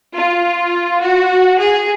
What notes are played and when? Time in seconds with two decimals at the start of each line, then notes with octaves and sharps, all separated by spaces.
0.14 F4
1.01 F#4
1.58 G#4